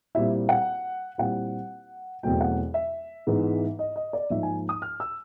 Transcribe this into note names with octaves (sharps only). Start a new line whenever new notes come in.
A#2 G3 C4 E4 E5
F#5
A#2 G3 C4 E4 F#5
E2 B2 F#3 A3 C4 G5
F#5
E5
G#2 E3 G#3 B3
D#5
D#5
D5
G#2 F3 A#3 D#4 E5
G#5
D#6
F6
E6